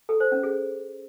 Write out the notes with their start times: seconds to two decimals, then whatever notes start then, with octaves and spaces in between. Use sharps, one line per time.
0.09 A4
0.20 C5
0.32 C#4
0.43 G#4